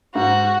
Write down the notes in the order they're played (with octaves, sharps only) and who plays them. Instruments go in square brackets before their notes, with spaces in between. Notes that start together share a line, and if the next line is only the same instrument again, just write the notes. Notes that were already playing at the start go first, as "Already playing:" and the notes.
[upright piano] G#2 [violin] F#4